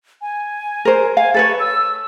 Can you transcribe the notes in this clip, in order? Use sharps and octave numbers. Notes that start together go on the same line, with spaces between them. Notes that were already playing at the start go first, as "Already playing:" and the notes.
G#5
A#4 C5
F5 G#5
A4 B4 C#5 A6
E6